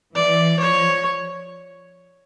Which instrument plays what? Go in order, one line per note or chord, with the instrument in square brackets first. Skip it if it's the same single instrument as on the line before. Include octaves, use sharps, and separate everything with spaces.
[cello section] E3 [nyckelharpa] D5
[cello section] F3 [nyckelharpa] C#5